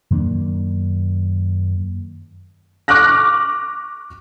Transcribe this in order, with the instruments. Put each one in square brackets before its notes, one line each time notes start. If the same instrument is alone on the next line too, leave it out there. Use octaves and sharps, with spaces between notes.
[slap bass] F#2 D#3 A#3 D4
[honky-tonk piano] C#6 D6 F6 F#6 A#6